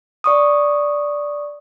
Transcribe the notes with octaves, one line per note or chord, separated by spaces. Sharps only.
D5 C#6 D#6